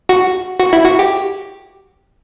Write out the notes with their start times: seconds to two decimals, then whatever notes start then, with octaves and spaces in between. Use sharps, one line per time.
0.09 F#4
0.60 F#4
0.73 E4
0.85 F#4
0.99 G4